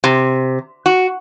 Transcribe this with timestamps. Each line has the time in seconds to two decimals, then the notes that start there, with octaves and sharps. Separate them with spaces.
0.04 C3
0.86 F#4